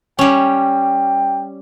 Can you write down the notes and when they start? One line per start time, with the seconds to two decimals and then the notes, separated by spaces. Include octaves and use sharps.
0.19 G3 C#4 G5